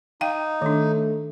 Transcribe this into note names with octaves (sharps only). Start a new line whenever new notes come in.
D#4 F5 G5
D#3 A3 D4